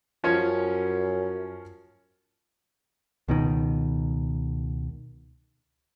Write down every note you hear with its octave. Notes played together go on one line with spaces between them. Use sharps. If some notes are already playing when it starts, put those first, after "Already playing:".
F#2 F3 C#4 C#5
C#2 B2 D#3